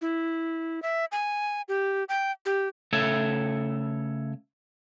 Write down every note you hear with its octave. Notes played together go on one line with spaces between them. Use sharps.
E4
E5
G#5
G4
G5
G4
C#3 A3 A4 C#5 E5